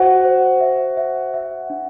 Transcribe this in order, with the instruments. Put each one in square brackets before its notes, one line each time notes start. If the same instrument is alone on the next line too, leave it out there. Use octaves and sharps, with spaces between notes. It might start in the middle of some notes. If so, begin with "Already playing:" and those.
Already playing: [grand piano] F#4 [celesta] C5
[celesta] C5
E5
E5
E5
D4